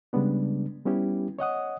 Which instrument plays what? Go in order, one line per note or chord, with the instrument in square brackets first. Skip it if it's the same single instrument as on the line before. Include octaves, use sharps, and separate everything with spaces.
[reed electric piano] C#3 G3 G#3 B3 D4
G3 B3 C#4 E4 G4
C#5 D#5 F#5 D#6